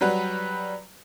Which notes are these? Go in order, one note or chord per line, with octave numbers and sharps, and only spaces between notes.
F#3 G3 F#4 B4